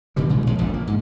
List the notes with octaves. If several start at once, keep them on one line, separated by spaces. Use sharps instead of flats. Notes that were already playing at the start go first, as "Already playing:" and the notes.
A#2 D#3 E3 G3
A#2 C#3 G#3
D#2 F3 G#3
E1 A#1 G#2
A#3
G#2